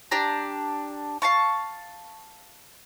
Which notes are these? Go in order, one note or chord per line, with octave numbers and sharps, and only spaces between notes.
D4 G4 A#5
F5 A5 C#6